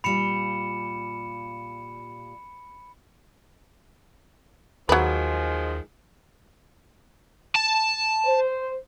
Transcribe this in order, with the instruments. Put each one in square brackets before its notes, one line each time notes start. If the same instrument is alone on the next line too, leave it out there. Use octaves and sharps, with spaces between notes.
[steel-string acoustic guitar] A#2 G3 F4 [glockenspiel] B5 C#7 E7
[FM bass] D#2 [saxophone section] D#3 F3 G#3 [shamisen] F#3 B4
[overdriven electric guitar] A5
[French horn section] C5